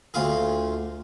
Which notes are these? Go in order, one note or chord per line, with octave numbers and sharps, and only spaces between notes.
D2 F4 G#4